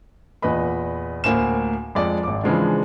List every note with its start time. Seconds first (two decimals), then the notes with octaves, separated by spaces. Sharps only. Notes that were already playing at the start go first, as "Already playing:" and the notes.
0.42 E2 A#2 B4 D#5 B5
1.24 D2 A2 A#3 C5 G#5 E7
1.95 F2 G#3 D5
2.23 G#1 D6
2.44 C#3 E3 F3 G#3 C4 D4